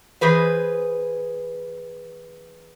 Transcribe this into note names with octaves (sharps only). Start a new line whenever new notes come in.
E3 G#4 B4 C5